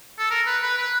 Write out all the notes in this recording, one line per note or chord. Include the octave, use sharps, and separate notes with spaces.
A4
A#4
B4
B4
B4